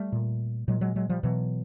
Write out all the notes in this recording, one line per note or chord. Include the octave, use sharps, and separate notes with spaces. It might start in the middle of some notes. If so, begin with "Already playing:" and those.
Already playing: G3 A3
A#2
A#2 F#3 G#3
F#3 G#3
F#3 G#3
F3 G3
B2 E3 F#3